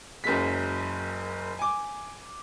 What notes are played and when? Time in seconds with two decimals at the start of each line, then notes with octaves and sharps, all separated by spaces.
0.24 F#1 F#2 G#3 B6
1.59 G#5 D6